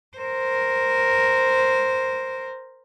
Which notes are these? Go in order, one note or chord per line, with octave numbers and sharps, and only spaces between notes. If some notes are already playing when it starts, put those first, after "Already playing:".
A#4 C5